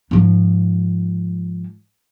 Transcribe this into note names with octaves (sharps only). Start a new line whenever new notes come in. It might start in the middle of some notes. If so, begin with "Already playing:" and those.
G#2 F3